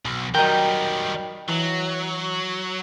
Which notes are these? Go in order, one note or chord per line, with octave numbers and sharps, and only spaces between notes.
B1
D#3 F#3 G3 A#4 D#5 G5
E3 F#3